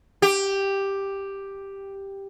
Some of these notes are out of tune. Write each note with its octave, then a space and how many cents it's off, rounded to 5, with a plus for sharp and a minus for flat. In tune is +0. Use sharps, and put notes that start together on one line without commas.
G4 +5